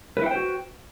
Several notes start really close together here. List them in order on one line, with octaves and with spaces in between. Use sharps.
B4 E4 G5 C5 F#4